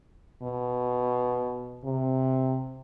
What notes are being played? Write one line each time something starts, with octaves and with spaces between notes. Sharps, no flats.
B2
C3